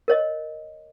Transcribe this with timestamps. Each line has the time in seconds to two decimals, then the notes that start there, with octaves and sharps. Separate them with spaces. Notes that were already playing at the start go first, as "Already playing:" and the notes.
0.08 A#4 C#5 D#5